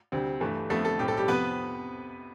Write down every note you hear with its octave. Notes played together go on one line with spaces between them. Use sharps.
D2 C3 G3 C4
G1 G2 E3 A3
F2 D3 F3 A3 B3 A4
A3 A4
B1 A2 G3 C4 G4
A4
G3 G4
F2 C3 F3 B3 B4